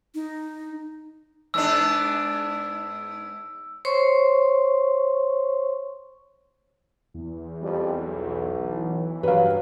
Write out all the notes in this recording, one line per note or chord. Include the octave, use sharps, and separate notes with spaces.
D#4
G#2 B3 D4 E6
C5 C#5 C6 C#6
E2
F2 G3
B1
E3
G2 F#3 G3 B4 F5